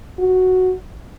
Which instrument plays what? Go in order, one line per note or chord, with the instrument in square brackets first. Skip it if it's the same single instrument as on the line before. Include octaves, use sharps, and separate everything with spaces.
[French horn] F#4